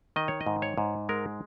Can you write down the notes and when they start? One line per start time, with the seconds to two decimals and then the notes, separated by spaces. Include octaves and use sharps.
0.16 D#3 D#5
0.28 C#5
0.41 D#5
0.46 G#2
0.62 C#5
0.78 G#2
1.09 G#3 A#4